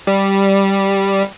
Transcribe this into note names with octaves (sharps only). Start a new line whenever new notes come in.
G3